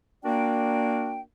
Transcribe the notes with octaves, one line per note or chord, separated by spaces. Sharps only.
A#3 D4 F#4 A#4 D5 G5